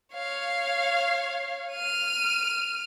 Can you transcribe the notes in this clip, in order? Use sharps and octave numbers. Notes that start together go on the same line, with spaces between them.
C#5 F5
F6 D#7